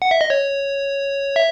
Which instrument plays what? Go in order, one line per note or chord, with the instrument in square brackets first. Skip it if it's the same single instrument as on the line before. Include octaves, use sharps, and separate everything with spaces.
[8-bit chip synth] F#5
E5
D#5
C#5
E5